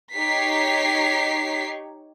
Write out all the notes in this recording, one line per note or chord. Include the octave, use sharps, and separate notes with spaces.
D#4 G4 C#5 B6 C7